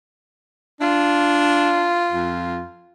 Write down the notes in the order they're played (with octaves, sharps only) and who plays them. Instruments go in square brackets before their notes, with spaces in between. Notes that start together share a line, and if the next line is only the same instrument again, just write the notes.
[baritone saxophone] D4 [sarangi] F4
[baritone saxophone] F2